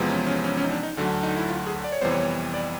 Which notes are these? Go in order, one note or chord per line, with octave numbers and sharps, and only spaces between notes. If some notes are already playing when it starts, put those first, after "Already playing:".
Already playing: E2 C3 F3 G#3 B3
C#4
C#4
C#4
C#4
D#4
D4
D#4
D2 D3 F#3 A3
D#4
E4
F4
G#4
D5
C#5
F2 C3 E3 G3 B3 C5
C#5
D5